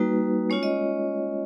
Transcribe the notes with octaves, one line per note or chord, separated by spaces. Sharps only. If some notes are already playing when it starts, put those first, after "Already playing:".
Already playing: G3 A#3 D#4 F#4 B4
G#3 C#4 F4 C#5
D#5